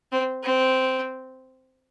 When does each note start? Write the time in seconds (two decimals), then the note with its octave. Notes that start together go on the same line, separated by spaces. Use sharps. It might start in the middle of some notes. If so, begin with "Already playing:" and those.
0.12 C4
0.43 C4